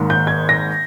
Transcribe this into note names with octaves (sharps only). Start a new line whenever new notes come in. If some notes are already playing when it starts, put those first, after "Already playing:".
Already playing: G#1 G#2 D#3 A#3
G6
G#6
A#6